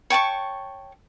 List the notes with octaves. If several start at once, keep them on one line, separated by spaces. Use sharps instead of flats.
C#5 G5 A5 C#6